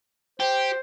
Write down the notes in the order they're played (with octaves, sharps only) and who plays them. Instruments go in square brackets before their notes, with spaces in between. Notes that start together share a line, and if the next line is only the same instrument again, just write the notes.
[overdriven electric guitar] G4 [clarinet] C5